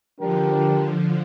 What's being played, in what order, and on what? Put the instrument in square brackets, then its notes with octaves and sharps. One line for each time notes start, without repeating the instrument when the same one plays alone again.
[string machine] D3 F3 [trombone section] G3 D4 G4 A#4